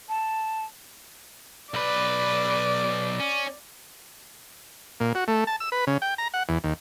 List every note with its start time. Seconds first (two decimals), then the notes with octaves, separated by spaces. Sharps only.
0.09 A5
1.74 B1 B4 D5
3.20 C#4
5.00 A#2
5.15 F#4
5.28 A3
5.47 A5
5.60 E6
5.72 B4
5.87 C#3
6.02 G5
6.18 A#5
6.34 F#5
6.49 E2
6.64 D#2